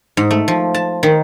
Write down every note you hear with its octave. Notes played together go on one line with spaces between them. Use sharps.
G#2
A3
F3
A5
D#3